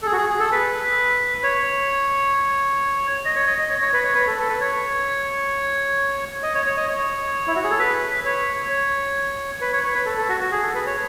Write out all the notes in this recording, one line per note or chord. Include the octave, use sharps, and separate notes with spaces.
A4
G#4
F#4
G#4
G#4
A4
B4
C#5
D#5
C#5
D#5
D#5
C#5
C#5
B4
C#5
B4
A4
A4
B4
C#5
D#5
C#5
C#5
D#5
C#5
E4
F#4
G#4
A4
B4
C#5
C#5
B4
C#5
C#5
B4
A4
A4
F#4
F#4
G#4
A4
B4
C#5